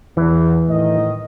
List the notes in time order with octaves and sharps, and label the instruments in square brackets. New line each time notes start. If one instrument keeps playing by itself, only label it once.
[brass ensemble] E2 [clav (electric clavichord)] E3
[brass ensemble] A2 D#3 D#5